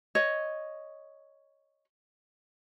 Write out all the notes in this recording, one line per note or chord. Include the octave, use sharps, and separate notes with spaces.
C#5 D#5